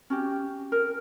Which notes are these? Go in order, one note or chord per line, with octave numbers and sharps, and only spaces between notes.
C#4 F#4 G4
A#4